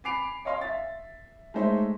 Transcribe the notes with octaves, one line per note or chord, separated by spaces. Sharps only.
G#5 B5 D6 C7 D7 F7
C#5 D#5 F5 C6
E5 A6
G#3 A3 D#4 C5 C#5 E5